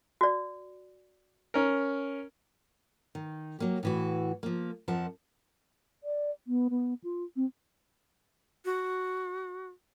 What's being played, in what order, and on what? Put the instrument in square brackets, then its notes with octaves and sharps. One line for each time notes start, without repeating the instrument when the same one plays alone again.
[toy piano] F#4 D5
[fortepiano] C#4 A#4
[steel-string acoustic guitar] D#3
F#3 A#3 G4
A2 E3 F#4
F3 A#3
F2 F3 A#4 E5 F#5 A5
[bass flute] D5
B3
B3
F4
C4
[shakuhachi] F#4